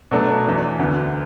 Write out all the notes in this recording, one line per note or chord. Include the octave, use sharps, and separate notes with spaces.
B2 F#3 A3 D4
E2 E3 D4
D2 D3 B3